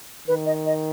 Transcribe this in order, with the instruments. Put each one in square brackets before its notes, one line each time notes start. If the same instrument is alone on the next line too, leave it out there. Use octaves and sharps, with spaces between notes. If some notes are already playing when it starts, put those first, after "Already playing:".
[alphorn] D#3 [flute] B4
[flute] D#5
D#5